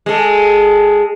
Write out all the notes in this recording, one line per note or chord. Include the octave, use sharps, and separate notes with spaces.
G#3 A4